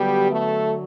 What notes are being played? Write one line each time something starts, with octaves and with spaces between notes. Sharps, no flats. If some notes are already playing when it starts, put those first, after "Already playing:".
Already playing: D3 F#3 G3 B3 G4
A3 A4